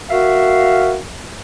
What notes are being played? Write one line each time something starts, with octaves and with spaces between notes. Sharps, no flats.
F#4 A#4 E5 F5